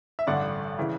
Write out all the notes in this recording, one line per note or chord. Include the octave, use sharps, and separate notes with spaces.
E5
A1 G2 D3 D5 F#5
C#3 E3